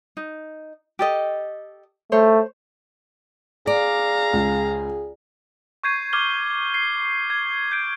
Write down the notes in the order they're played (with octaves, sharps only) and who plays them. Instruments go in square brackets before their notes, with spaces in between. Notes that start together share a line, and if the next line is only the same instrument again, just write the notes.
[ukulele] D#4
G4 A4 D#5
[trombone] A3 [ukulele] C5 C#5
[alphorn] G#4 [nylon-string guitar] D5 [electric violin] F5 A#5
[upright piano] C#2
[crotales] C#6 G6 G#6 C7 D#7
D6 F6 G#6 G7
C7
G#6
G6 C7 D7